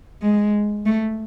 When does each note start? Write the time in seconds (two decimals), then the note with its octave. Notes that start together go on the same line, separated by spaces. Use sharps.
0.22 G#3
0.86 A3